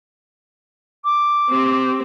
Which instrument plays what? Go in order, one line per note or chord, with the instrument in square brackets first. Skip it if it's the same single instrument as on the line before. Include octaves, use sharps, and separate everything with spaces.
[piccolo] D6
[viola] C4 G4